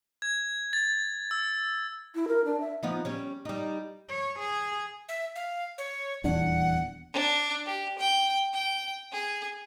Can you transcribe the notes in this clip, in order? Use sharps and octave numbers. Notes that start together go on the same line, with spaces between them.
G#6
A6
E6
E4
A#4
D4
E5
F3 B3 D#4
G3 C#4 C#5
G3 D#4
C#5
G#4
E5
F5
C#5
D#1 E2 D4 F#5
D4
G4
G5
G5
G#4